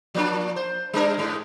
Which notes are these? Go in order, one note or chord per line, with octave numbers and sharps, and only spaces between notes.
F3 A#3 D4
C5
G3 D4 A#4
G#2 G#3